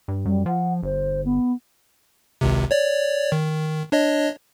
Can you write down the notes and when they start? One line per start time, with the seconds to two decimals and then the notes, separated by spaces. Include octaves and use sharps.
0.08 G2
0.25 F#2 G3
0.46 F3 F#5
0.83 G1 C5
1.24 B3
2.41 G#1 C#2 C3
2.71 C#5 D5
3.32 D#3
3.92 D4 C#5 D#5